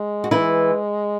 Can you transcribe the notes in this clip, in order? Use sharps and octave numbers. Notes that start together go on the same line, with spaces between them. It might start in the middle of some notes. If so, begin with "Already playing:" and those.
Already playing: G#3
F#4
E3 G#3 E4